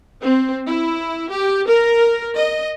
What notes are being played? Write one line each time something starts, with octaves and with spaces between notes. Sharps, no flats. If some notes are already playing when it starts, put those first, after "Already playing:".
C4
E4
G4
A#4
D#5